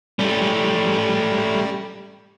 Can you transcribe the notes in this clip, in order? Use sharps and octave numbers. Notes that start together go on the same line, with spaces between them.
G3 A3 C#4